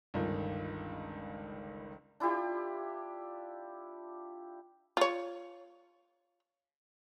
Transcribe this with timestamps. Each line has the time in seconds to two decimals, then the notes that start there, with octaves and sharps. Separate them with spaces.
0.14 G1 C#2 D#3
2.20 D4 E4 F4 G4
4.97 F4 C#5